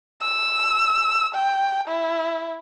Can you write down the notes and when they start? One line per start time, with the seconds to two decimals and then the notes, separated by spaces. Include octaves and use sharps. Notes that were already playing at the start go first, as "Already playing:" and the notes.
0.22 E6
1.35 G5
1.88 E4